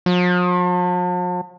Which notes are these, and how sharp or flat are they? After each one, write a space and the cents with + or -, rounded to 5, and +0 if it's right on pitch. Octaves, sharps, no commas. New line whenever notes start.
F3 +45